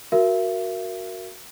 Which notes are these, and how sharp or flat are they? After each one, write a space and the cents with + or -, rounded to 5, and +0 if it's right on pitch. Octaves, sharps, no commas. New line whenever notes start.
F#4 +0 A#4 +0 E5 +35